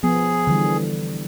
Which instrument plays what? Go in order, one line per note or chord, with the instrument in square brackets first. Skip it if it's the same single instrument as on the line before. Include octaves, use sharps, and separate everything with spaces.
[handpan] F3 B3 [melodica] G#4
[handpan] D3 E3 G3